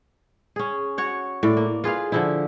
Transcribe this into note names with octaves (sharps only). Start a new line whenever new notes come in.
C#4 G#4
F#4 C#5 F#5
A2 D5
A#3
F4 G#4 B4 F5
D3 F3 E4